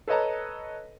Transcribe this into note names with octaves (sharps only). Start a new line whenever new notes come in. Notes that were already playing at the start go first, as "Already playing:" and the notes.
A4 B4 C#5 D#5 A5 A#5